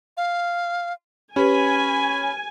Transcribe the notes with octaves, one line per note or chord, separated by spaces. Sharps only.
F5
C#4 G4 B4 G#5 B5